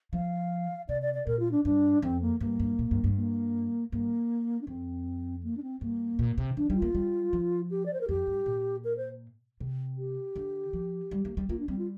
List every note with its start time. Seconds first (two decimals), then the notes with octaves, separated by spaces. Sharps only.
0.13 F3 F5
0.89 C3 D5
1.02 D5
1.14 D5
1.27 A#2 A#4
1.40 F4
1.51 D4
1.64 G2 D4
2.02 F2 C4
2.22 A#3
2.40 G2 A#3
2.60 G2
2.79 A#2
2.91 G2
3.04 G2
3.16 A#3
3.92 G2 A#3
4.61 D4
4.67 F2 C4
5.43 A#3
5.57 D4
5.63 C4
5.81 G2 A#3
6.19 A#2
6.38 C3
6.57 F3 D4
6.70 G3 D4
6.76 F4
6.82 A#3
6.95 G3
7.33 F3
7.71 G4
7.86 D5
7.93 C5
8.01 A#4
8.08 F2 G4
8.27 G2
8.46 A#2
8.84 A#4
8.97 C5
9.60 C3
9.98 G4
10.36 D3
10.73 F3
11.11 G3
11.25 A#3
11.37 G3
11.49 A#3 F4
11.60 D4
11.68 G3 C4
11.78 F4